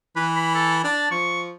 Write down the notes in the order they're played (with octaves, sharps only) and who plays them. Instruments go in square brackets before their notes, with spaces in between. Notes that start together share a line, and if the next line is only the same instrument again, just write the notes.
[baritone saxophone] E3 [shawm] B4
[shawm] B5
A4
[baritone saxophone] D4 [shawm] A5
[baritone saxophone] F3 [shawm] C#6